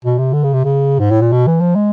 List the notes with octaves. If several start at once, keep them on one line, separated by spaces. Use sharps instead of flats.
B2
C3
D3
C#3
C3
C#3
G#2
A2
A#2
B2
E3
F3
G#3